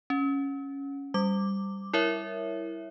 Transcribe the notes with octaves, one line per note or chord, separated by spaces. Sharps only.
C#4
G3 D6
E4 A#4 C#5 E5